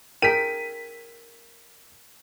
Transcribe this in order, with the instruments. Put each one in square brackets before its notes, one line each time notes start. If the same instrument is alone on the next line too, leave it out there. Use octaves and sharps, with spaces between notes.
[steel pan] G#4 A#4 G5 [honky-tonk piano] B6 D#7